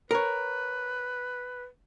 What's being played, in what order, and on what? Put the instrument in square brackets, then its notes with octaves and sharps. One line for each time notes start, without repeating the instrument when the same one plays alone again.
[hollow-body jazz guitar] A#4 C#5 [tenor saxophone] B4